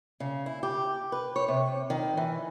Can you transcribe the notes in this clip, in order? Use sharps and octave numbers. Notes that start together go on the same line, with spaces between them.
C#3
E4
G4
B4
C#5
C3
D#3
E3